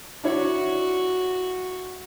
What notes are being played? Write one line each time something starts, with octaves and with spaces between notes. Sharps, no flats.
D4 E4 F#4 C#5